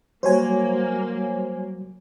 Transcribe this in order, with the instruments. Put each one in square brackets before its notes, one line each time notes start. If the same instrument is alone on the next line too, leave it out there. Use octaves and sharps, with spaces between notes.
[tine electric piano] F#3 G3 [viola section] A#3 [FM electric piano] C5 C#5 G#5